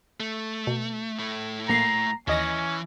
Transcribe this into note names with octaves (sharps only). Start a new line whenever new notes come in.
A3
B2
A2 A3
A#1 A#3 A#5 C7
D#2 E3 C#4 D#5 A#6